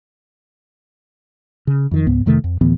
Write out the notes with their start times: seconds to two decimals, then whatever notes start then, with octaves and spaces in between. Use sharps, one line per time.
1.67 C#3
1.91 F2 D#3
2.07 C#2 G#2 B3
2.26 F2 C3 D#3 A3
2.44 F2
2.61 D2 A2 E3 B3